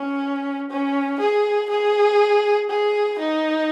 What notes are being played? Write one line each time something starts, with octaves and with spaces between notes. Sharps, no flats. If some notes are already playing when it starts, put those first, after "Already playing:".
Already playing: C#4
C#4
G#4
G#4
G#4
D#4